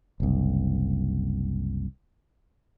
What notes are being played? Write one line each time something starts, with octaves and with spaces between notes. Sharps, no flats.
F#1 C2